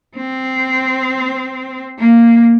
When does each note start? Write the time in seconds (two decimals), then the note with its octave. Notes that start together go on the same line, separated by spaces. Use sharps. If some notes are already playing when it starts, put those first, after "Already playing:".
0.16 C4
1.98 A#3